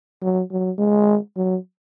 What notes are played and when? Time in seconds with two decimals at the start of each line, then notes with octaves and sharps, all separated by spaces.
0.22 F#3
0.51 F#3
0.78 G#3
1.36 F#3